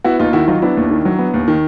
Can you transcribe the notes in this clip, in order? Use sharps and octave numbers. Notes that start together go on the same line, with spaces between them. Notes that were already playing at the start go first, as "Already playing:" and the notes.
B3 E4 F#4
D#2 D#4 F4
D#3 E4 F#4
F#3 D#4 F4
B3 D4 E4
D#2
D#3
F#3
B3
D#2
D#3